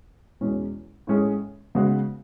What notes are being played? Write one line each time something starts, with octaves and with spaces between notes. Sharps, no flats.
E2 B2 G#3 C#4
A2 G#3 C#4 G#4
C#3 G#3 B3 F#4